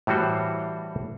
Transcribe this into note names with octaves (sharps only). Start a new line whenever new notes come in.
A2 E3 G3 F#4 C5